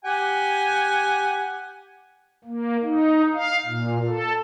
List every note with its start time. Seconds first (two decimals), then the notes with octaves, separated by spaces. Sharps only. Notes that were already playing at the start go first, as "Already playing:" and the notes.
0.05 G4 F#5 G#5
2.44 A#3
2.83 D#4
3.34 F5
3.66 A#2
4.08 A4